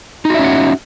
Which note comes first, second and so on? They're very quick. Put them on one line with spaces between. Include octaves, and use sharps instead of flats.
D#4 F#4 E5 C#4 F#5